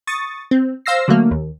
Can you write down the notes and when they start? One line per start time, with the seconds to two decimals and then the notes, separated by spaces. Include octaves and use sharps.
0.07 C#6 D#6 A6
0.51 C4
0.86 C5 F5 E6 A#6 C7
1.08 D3 F#3 A3 A#3
1.31 D#2